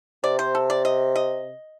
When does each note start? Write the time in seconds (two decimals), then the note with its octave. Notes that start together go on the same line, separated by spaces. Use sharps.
0.24 C3 D5
0.39 C5
0.55 A4
0.70 D5
0.85 D#5
1.16 D#5